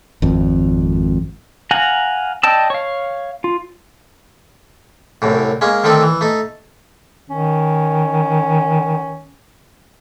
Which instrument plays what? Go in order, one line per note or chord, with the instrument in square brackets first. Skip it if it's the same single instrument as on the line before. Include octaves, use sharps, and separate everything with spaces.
[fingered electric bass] G#1 F2
[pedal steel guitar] F5 F#5 G#5 A#5
D5 D#5 G5 A5 E6
C#5 F5
F4
[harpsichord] C2 F#2 A2
G#3 A#3 C#4
D3 D#3 A3 C4 D#4
E3
A3 D#4
[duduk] D#3 [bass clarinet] C#4